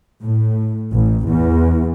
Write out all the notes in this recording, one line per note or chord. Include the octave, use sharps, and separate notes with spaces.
A2
A1
E2